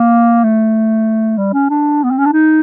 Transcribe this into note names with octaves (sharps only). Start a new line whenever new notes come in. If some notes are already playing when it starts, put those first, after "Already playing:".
Already playing: A#3
A3
G3
C#4
D4
B3
C4
C#4
D4
D#4